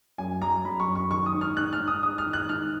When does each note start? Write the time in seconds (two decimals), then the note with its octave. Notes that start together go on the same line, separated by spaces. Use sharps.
0.18 F#2 G#5
0.41 F#2 A#5
0.65 F#2 B5
0.80 C#6
0.88 F#2
0.95 C#6
1.10 D#3 C#6
1.26 D#6
1.34 G#2
1.41 F6
1.57 G#2 F#6
1.73 F6
1.80 G#2
1.88 D#6
2.03 G#2 D#6
2.18 F6
2.26 D#3
2.33 F#6
2.49 G#2 F6